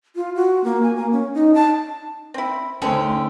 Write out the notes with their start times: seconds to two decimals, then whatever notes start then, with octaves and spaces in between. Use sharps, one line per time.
0.16 F4
0.36 F#4
0.64 A#3
0.83 G#5
0.96 A#3
1.12 C#4
1.34 D#4
1.54 A5
2.34 C4 E4
2.82 D#2 D3 A3 C#4 G#4 A4 C5 G5